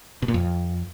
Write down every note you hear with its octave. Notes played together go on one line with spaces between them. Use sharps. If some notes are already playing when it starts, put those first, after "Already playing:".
B2
A#2
F2